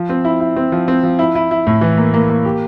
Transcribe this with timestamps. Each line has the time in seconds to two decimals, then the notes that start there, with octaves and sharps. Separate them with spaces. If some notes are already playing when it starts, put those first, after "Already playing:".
Already playing: F3
0.09 C4
0.25 E4
0.40 E4
0.56 C4
0.72 F3
0.88 C4
1.03 F3
1.19 E4
1.35 E4
1.51 E4
1.67 A2
1.81 E3
1.98 A#3
2.14 A#3
2.30 A#3
2.45 G4